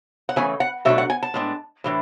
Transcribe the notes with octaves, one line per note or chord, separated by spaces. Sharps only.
F#5
C#3 E3 A3 G#5
F#5
B2 F#3 A3 D4 E5
F#5
G#5
A5
A2 G#3 B3 D4
A2 E3 D4